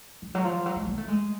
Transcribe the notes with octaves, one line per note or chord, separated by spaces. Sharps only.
E3
F#3
F3
F#3
G#3
A#3
A3
G#3